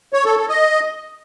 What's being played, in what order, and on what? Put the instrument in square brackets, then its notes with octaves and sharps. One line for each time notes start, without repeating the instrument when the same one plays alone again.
[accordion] C#5
A4
A4
D#5